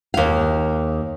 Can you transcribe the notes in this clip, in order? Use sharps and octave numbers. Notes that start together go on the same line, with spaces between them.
D#2 F5